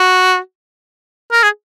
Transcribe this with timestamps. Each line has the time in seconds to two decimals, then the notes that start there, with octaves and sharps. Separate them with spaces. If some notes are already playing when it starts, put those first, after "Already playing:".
Already playing: F#4
1.32 A#4
1.43 G#4